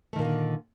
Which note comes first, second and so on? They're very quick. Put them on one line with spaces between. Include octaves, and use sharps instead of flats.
A3 D#3 A#2 A#3 D3